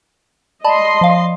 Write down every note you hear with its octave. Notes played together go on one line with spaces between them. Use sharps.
D5 D#5 A5 B5 C6
F3 F5